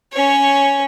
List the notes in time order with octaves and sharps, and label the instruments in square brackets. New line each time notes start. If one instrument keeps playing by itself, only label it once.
[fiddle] C#4 C#5